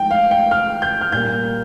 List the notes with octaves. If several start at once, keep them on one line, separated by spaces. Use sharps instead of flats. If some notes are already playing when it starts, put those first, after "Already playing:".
Already playing: G#2 F3 G5
F5
G5
F6
G6
F6
A#2 G3 A#3 G6